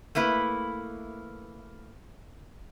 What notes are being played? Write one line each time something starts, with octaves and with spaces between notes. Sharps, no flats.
A3 A#3 E4 B4